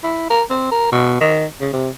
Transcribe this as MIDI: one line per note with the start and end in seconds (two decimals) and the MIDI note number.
0.03 0.25 64
0.30 0.42 70
0.50 0.70 60
0.71 0.90 70
0.92 1.16 47
1.20 1.45 51
1.60 1.68 49
1.73 1.90 48